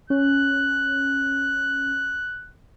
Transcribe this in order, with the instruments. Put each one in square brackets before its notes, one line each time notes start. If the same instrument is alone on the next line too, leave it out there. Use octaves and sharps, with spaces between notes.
[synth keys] C#4 [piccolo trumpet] F#6